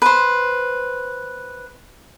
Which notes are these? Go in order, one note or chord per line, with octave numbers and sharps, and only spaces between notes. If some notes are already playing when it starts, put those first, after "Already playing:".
B4 C5